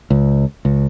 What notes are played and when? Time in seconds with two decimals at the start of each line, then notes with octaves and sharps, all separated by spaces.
0.10 C#2
0.65 C#2